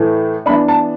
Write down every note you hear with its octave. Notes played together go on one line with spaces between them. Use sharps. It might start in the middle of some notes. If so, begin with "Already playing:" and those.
Already playing: A2 E3 A3
E3 B3 D4 B5
A5